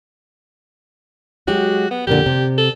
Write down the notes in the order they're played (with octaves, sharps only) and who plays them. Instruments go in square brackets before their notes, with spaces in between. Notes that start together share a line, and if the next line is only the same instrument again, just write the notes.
[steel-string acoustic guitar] F#3 G#3 G4 [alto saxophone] F#4
[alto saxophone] B3
[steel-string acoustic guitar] F2 A#2 D3 [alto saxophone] G4
[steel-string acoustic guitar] C3
[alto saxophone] A4